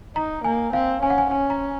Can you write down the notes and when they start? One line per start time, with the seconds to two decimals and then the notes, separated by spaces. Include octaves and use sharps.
0.16 D#4 A#5
0.44 A#3 G#5
0.73 C4 F5
1.03 C#4 G#5
1.10 F#5
1.18 G#5
1.31 C#4 G#5
1.50 A#5